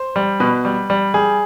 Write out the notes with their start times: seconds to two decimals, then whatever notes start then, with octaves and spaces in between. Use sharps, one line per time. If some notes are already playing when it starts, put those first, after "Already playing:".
Already playing: C5
0.16 G3
0.40 B2 B4
0.65 G3
0.90 G3
1.14 G3 G#4